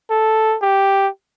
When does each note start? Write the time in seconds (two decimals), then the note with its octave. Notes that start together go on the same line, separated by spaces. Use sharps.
0.10 A4
0.62 G4